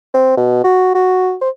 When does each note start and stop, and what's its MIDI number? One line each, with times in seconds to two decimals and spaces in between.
0.14 0.36 60
0.37 0.64 47
0.64 0.92 66
0.95 1.35 66
1.41 1.49 72